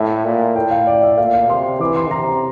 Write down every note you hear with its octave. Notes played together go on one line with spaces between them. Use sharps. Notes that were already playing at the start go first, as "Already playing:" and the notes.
Already playing: A2 E5
A#2
A2 G5
F5
D5
E5
A#2 F5
F5
C3 C6
E3 D6
C6
C3 A#5